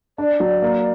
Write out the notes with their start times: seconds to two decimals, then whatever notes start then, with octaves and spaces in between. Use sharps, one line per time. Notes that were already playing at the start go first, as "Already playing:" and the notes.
0.18 D4 D5
0.40 F#3
0.62 A#3